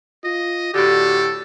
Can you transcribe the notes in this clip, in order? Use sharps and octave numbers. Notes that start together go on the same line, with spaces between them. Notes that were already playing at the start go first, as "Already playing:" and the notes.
F4 D#5
A2 D3 F#4 G4 A4